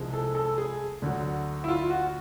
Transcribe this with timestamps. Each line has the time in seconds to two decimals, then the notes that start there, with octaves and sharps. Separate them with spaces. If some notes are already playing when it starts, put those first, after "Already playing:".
Already playing: C2 C3 F3 G#3
0.13 A4
0.35 A4
0.58 G#4
1.02 D2 D3 F#3
1.64 E4
1.68 F4
1.90 F#4